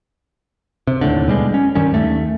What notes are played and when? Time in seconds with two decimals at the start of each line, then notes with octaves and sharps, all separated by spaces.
0.87 C3
1.01 D#2 A2 D3
1.28 B2 G3 G#3
1.54 C#4
1.75 G2 D#3 G3 C#4
1.93 D#2 A3